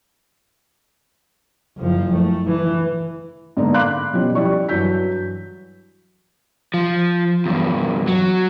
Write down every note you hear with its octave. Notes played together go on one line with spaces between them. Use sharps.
F#1 F3
A3
E3
G#2 D3 A#3 B3 D4 D#4
F5 B5 C6 D6 F#6
B2 F3 G3 C#4
G3 E4 D5 C#6
G2 E3 F#3 G6 B6
F3
E2 G2
F#3